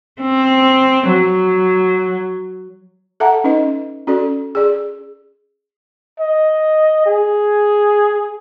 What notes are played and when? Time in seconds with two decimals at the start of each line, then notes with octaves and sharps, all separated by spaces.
0.21 C4
1.09 F#3
3.20 A4 E5 F#5 A5 A#5
3.44 C#4 D#4 B4 D#5
4.07 C#4 F#4 A4 D5
4.55 G#4 D5
6.20 D#5
7.06 G#4